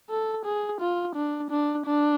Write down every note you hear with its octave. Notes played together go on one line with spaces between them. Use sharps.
A4
G#4
F4
D4
D4
D4